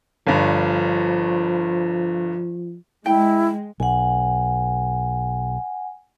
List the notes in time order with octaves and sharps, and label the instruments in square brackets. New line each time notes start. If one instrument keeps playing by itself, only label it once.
[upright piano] G1 G2 [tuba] F3
[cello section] G#3 [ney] E4 [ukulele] G5
[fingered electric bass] B1 [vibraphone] F#5 G#5